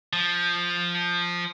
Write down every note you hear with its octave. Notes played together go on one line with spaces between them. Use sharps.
F3